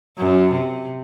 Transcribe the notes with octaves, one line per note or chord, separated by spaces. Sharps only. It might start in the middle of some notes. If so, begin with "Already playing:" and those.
F#2
C3